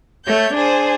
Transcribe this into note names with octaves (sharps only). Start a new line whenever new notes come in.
A3 C#5 G6
D4 G#4 C5